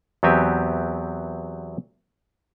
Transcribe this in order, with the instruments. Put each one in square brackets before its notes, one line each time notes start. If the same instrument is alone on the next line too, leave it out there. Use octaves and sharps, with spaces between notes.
[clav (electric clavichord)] E2 F#3 B3 C4 G4 G#5